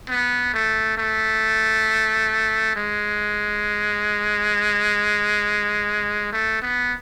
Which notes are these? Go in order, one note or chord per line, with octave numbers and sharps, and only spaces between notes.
B3
A3
A3
G#3
A3
B3